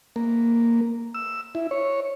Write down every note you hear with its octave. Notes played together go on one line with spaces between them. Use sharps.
A#3
E6
E4
C#5